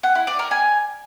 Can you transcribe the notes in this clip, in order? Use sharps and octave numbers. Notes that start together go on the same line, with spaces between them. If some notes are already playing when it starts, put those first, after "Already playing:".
F#5
E4
D5
A#4
G#5